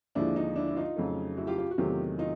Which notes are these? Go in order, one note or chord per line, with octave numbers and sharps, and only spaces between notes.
D#2 D3 F3 G#3 D4 E4
D#4
D4 E4
E4
D#4 F4
F2 C#3 F#3 A3
E4 F#4
F4 G4
F4 G4
F#4
E2 C3 D#3 F#3 A3 F4 G4
D#4 F4